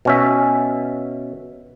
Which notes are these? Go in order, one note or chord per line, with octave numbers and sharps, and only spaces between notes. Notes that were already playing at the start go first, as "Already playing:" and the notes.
B2 C#4 E5